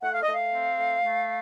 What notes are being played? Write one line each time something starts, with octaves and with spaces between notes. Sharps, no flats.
A3 F#5
F5
D#5
A3 F5
C4
A3
A3